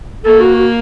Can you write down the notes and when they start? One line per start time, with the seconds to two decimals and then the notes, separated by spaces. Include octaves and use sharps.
0.25 A#3 A4
0.40 F#4
0.56 F#4